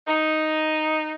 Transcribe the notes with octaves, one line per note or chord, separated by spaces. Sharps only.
D#4